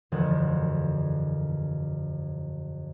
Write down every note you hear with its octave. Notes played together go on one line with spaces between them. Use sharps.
E1 F#2 D3 F3 F#5 G#6